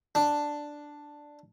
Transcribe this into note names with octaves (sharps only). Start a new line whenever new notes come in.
D4